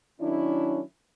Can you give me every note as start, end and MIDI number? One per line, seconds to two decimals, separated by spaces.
0.21 0.81 51
0.21 0.80 54
0.21 0.80 61
0.21 0.80 62
0.21 0.81 64